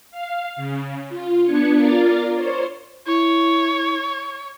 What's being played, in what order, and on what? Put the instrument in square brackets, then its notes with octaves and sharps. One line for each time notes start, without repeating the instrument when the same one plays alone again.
[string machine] F5
C#3
F4
B3 D4 G#6 C#7
F4 A#4 D5 A6
C5 C#5
[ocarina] E4 [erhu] C#5